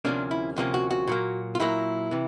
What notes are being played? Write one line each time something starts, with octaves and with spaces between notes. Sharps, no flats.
D2 C3 F3 A#3 C#4 D4
E4
D2 C3 F3 A#3 C#4
F#4
F#4
A#2 F#3 A#3
F4
A#2 F#3 A#3 E4
C3 E3